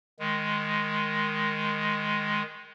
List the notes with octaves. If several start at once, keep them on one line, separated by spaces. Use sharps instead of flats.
D#3 G#3